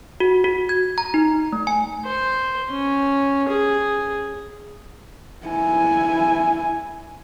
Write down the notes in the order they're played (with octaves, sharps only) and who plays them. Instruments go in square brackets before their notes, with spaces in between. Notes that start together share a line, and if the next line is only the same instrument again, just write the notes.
[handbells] F#4
F#4
G#6
A#5
D#4
A3
G#5
[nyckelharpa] C5
C#4
G#4
[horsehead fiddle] E4 G#5